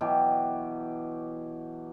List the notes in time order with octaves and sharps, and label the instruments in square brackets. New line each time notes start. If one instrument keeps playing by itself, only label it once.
[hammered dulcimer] B2 E3 F#3 G4